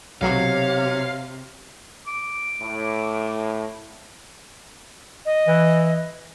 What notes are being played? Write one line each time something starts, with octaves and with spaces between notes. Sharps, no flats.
B1 C3 F#3 C#5 F5
D6
A2
D#5
E3